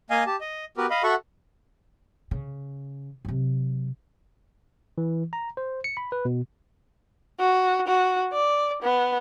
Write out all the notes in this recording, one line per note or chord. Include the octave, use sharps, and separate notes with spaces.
A#3 D#5 F5 G#5
G4 A5
D#5
B3 F#4 G4 A#4 B4
D#5 F5 B5
F#4 A4 E5 F#5 C#6
C#3
C3 F#3
E3
A#5
C5
C#7
B5
B4
B2
F#4
F#4
D5
B3